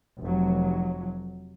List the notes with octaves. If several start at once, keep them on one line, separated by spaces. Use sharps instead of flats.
F1 F#3